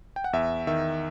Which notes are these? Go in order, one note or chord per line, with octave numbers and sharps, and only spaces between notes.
G5
F#5
E2 E5
D#3 E5